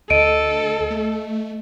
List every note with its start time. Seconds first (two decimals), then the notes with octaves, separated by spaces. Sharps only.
0.10 D2 A4 D#5 D7 D#7
0.90 A3